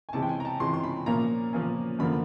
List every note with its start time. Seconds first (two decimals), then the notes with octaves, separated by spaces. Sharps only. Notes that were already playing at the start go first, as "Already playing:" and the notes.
0.09 G#5
0.13 C3 E3 G#3 C#4 A5
0.23 G5
0.29 G#5
0.40 A#5
0.45 A5
0.60 C3 E3 G#3 C#4 C6
0.74 C6
0.84 B5
1.06 A#2 F3 A#3 C#4 A#5
1.53 A#2 F3 A#3 C#4
1.99 F#2 D3 F3 A#3 B5